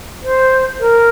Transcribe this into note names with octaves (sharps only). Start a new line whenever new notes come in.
C5
A#4